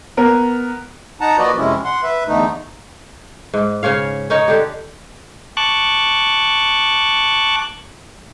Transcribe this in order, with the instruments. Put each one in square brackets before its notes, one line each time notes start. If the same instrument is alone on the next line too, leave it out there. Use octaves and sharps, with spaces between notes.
[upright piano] B3 A#4
[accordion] D#4 F#5 A5 A#5
F3 A#3 F#4 B4 D5 D#5
F2 C3 G#3 C#4 E4
F#5 C6
B4 E5
E2 D3 A3 D#4
[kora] G#2
C#3 C#4 C#5 F5
C#4 D#4 C#5
D3 G4
[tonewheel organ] A5 C#6 D6 F#6